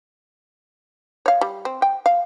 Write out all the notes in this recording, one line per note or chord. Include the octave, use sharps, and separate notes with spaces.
C#5 F5
G3
C4
G5
F5